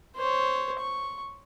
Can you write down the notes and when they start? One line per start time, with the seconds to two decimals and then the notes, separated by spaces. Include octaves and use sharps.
0.16 C5 C#5
0.79 C#6